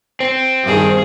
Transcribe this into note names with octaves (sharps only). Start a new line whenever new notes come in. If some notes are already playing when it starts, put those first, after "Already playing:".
C4
G2 D#3 G#4